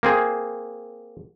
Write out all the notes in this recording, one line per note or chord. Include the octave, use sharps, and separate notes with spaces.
A#3 C4 G#4